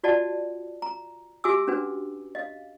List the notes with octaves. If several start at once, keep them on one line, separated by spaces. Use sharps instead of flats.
F4 F#4 D5 D#5 F#5 A5
A#5
F#4 G4 E5 G#5 D6 E6
C#4 D4 F#4 B4
D#5 F5